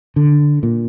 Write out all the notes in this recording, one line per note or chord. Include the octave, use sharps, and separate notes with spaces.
D3
A#2